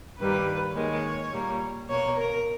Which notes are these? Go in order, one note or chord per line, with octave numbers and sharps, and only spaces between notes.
G2 D#3 G3 A#3 B4
D#2 D#3 G#3 C#5
A#2 G3 A#3
B2 A#3 C#5
A#4